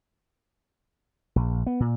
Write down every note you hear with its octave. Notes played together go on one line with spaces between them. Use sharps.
A#1
B3
A#2